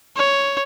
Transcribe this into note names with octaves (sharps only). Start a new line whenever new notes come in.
C#5